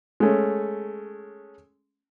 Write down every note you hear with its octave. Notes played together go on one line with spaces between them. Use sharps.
G#3 A3 C#4